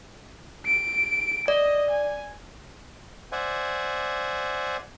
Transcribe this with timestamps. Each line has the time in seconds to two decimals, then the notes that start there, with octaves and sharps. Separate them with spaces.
0.66 D7
1.48 D5 D#5
1.90 G#5
3.32 C5 D5 E5 F#5 G#5